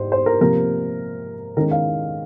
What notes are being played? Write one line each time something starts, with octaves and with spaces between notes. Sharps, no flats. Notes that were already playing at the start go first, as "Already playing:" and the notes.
Already playing: G#2 G3 C5
C5
A#4
C3 F3 A#3 A#4
D#3 G#3 C#4 A#4
F5